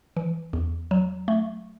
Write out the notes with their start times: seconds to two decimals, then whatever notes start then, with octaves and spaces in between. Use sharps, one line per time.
0.16 E3
0.53 E2
0.91 F#3
1.28 A3